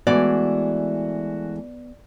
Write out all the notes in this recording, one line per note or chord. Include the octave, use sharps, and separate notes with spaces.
E3 G#3 A3 B3 F#4 D5